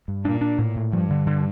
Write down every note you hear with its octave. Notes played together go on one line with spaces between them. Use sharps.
G2
A#2 D4
D4
A2
A2
G2 F3
D3
D3